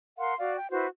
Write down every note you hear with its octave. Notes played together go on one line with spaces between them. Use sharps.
A#4 F5 F#5 C6
F#4 D5 F5
G5
E4 F#4 B4 C5